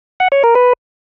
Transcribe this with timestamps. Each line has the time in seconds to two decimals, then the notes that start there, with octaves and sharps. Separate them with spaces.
0.20 F#5
0.32 C#5
0.44 A#4
0.55 B4